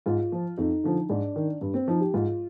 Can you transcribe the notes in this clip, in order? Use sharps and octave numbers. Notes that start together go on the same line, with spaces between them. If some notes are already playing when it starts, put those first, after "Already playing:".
G#2 F4
F3
F2 D#4
D3 F3
G#2 D4
D#3
G2
C4
F3 D#4
G4
G#2 F4